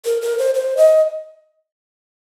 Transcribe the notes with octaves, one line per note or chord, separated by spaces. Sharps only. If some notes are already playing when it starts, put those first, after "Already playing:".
A#4
A#4
C5
C5
D#5